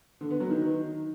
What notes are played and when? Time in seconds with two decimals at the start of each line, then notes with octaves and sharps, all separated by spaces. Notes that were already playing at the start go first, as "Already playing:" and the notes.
0.21 D3
0.31 B3
0.40 F#3
0.50 D#3